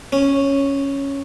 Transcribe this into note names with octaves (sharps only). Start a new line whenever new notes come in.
C#4